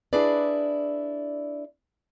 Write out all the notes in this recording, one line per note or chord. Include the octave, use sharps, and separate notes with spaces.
D4 E4 G#4 B4 D5